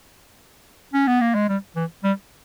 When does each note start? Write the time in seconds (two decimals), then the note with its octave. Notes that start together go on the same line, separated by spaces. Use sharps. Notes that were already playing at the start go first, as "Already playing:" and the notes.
0.94 C#4
1.07 B3
1.21 A#3
1.35 G#3
1.49 G3
1.76 E3
2.04 G3